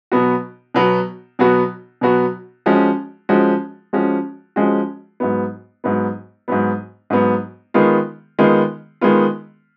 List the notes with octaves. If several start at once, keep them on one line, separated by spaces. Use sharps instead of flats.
B2 F#3 B3 F#4
B2 F#3 B3 F#4
B2 F#3 B3 F#4
B2 F#3 B3 F#4
F3 G#3 C#4 F#4
F3 G#3 C#4 F#4
F3 G#3 C#4 F#4
F3 G#3 C#4 F#4
G#2 F#3 B3
G#2 F#3 B3
G#2 F#3 B3
G#2 F#3 B3
D#3 G#3 B3 F4
D#3 G#3 B3 F4
D#3 G#3 B3 F4